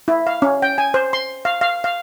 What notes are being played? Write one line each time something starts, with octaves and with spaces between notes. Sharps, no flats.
E4
F5
C#4
G5
G#5
C5
C6
F5
F5
F5